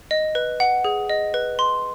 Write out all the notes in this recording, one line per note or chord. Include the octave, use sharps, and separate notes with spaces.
D#5
B4
F#5
G#4
D#5
B4
C6